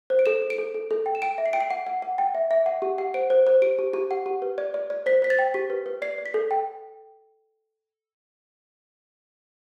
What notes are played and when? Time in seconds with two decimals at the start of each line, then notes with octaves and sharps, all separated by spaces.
0.10 C5
0.19 D7
0.26 A4 E7
0.42 A4
0.50 D7
0.58 A4
0.74 A4
0.91 A4
1.06 G5
1.15 E7
1.22 G5 D7
1.38 E5
1.46 C7
1.53 G5 D7
1.61 C7
1.70 F#5
1.87 F#5
2.02 F#5
2.18 G5
2.35 E5
2.51 E5
2.66 F#5
2.82 G4
2.98 F#5
3.14 C5 D7
3.30 C5
3.47 C5
3.62 G4 D7
3.79 G4
3.94 G4
4.11 F#5
4.26 G4
4.42 B4
4.58 D5
4.74 D5
4.90 D5
5.06 C5 B6
5.22 C5 B6
5.30 A6
5.39 G5
5.54 G4 B6
5.70 B4
5.86 B4
6.02 D5 C7
6.18 D5
6.26 B6
6.34 A4
6.51 G5